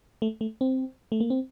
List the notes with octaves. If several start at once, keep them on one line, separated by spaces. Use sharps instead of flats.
A3
A3
C4
A3
A#3
C4